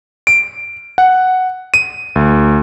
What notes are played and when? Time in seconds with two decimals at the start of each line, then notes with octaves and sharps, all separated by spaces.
0.27 D7
0.98 F#5
1.74 D#7
2.16 D2